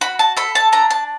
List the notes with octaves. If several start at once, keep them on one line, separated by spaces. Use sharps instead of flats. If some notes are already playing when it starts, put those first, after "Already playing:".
F#4 B5
A5
A4 B5
A5
D4 A#5
A5